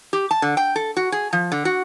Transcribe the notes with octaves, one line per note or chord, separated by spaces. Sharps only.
G4
A5
D3
G5
A4
F#4
G#4
F3
D3
F#4